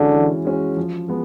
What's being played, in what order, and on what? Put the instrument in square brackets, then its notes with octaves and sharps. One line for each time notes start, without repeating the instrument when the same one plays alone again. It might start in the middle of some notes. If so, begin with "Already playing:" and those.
Already playing: [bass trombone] D3 [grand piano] E3 G#3 C#4 F#4
[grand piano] E3
G#3 C#4 F#4
F3
G#3 B3